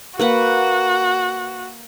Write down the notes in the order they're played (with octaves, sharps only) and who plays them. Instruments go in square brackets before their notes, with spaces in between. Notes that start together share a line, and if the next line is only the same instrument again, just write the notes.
[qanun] A#3 B4 F#5 [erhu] F#4